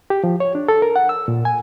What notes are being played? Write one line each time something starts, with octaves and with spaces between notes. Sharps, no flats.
G4
F3
C#5
D4
A4
A#4
F#5
E6
A#2
G#5